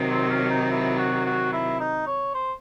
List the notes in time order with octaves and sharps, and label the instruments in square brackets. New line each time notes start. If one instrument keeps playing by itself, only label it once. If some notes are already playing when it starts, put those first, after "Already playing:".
Already playing: [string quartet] C3 D#3 F#3
[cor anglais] C4
C#4
D#4
E4
F#4
F#4
E4
D#4
C#5
C5